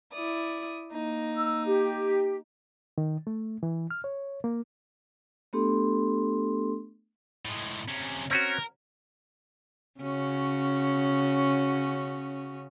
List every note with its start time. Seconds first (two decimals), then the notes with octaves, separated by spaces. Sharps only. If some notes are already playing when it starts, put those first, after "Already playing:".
0.13 E4 D5 D#6
0.92 A#3 D#4
1.36 E6
1.65 G4
2.98 D#3
3.27 A3
3.63 E3
3.91 F6
4.04 C#5
4.44 A#3
5.53 A3 B3 D4 G4 A4 C6
7.45 A2 G#3
7.88 C3 C#4
8.31 C4 C#4 F#4 A#4
10.00 C#3 C#4 F#4